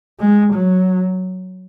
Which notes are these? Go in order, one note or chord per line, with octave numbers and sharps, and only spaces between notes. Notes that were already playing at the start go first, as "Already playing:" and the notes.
G#3
F#3